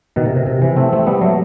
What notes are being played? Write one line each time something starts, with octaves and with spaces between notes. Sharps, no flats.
B2 D#3
C3
C3
C3
C3 E3
A3 C4
A3 C4
G3 B3
F#3 A3